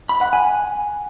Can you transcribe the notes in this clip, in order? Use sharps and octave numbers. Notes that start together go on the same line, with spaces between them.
B5
F#5
G#5